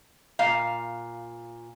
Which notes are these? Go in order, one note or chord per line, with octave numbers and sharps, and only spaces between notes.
A#2 F5